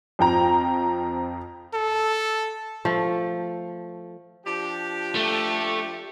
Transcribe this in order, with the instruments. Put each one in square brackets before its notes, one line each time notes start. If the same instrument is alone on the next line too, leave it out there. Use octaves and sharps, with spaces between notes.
[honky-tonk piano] F2 F3 G5 A#5
[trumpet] A4
[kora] F3 A3
[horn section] F3 D4 G4
[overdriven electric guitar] A3